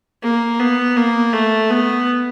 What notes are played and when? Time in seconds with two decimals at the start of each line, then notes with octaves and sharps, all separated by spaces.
0.23 A#3
0.59 B3
0.97 A#3
1.33 A3
1.70 B3